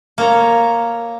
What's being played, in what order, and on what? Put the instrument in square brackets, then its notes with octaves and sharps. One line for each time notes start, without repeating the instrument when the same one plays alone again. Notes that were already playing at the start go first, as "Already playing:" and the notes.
[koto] A#3 A4 C#5 A#5